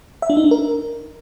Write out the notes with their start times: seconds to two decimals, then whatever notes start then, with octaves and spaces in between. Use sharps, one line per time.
0.22 E5
0.30 D4
0.37 D#4
0.44 D4
0.51 A#4